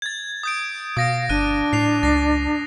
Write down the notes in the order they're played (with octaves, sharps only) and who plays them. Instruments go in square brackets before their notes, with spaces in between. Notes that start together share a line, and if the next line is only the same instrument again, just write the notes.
[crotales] G#6 A6
D#6 G6 D7
[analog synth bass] B2 [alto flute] F5 [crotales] D#6 A#6 D7
[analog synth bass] G1 [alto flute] D4 [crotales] F#6 D#7
[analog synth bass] A2 [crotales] C7 F7
[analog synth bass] C#2 [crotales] A#6 C7